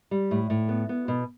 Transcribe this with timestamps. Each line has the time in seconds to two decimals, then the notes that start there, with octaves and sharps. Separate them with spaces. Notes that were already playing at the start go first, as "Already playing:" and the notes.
0.11 G3
0.31 A2
0.50 A2
0.69 B3
0.89 B3
1.08 B2